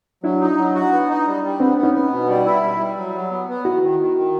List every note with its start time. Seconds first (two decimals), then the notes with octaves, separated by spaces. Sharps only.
0.24 F#3 D4 E4
0.40 D#4
0.58 F#3
0.75 F#4
0.92 B3
1.09 D#4
1.26 G3
1.44 G3
1.60 B3 C4 D4
1.77 B3
1.83 C#4 D#4
1.94 B3
2.11 B2
2.29 G3
2.46 E4
2.63 G3
2.80 G3
2.97 F#3
3.14 F#3
3.31 B3
3.49 B3
3.65 D#3 E4 F#4
3.83 D#3
4.00 D#3
4.17 D#3